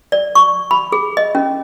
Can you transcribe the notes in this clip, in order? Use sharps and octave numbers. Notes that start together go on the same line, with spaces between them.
D5
C#6
B5
G#4
D#5
C#4